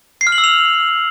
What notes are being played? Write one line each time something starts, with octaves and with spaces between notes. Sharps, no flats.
C7
F6
F#7
E6
F7